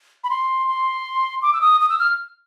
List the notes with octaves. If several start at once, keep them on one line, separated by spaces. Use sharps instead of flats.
B5
C6
C6
D6
E6
D#6
D#6
E6
F6